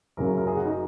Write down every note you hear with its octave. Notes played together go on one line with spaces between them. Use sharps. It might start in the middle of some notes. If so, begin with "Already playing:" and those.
F#1 F#2 C#3 F#3 A#4
A#4
G#4
F#4
D#4